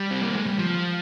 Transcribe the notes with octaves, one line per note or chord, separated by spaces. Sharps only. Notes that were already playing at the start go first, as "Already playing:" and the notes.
Already playing: G3
C4
A#3
G#3
G3
F3